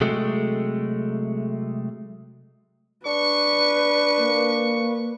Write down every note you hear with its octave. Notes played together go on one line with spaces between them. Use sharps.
C3 F#3 G#3 A3
D4 B4 C#6
A#3